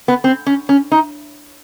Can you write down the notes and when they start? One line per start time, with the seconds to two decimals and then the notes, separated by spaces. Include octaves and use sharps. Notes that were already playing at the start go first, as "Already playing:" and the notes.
0.08 B3
0.24 C4
0.47 C#4
0.69 C#4
0.92 D#4